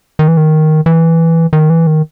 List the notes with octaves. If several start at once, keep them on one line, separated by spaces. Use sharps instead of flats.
D#3
E3
D#3
E3
D#3
E3
D#3